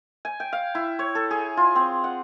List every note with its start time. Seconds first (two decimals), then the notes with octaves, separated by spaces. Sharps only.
0.25 G#5
0.40 G5
0.53 F5
0.75 E4
0.99 C#5
1.15 A4
1.31 G#4
1.57 F4
1.75 C4
2.04 F#5